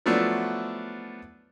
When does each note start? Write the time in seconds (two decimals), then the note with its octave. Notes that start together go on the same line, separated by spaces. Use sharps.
0.06 F3 F#3 A3 B3 D4 E4